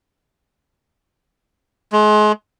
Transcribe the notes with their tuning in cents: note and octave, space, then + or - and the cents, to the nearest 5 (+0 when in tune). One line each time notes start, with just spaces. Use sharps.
G#3 +35